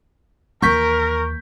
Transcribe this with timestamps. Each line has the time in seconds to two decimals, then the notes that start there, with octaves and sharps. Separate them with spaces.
0.62 D#2 E3 A#4 C#6 G6 B6